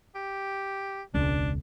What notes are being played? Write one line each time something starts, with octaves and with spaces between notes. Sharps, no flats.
G4
E1 C#2 D4